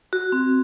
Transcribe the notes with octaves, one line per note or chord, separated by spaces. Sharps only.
F#4
C4